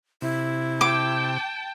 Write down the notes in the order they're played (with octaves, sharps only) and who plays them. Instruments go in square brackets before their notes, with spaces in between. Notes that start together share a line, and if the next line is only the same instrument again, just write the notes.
[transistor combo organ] C3 [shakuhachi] E4
[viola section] G5 A5 [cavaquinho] D6